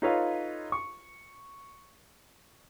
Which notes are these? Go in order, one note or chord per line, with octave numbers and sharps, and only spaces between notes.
D#4 F4 A4 B4 C#5 F5
C#6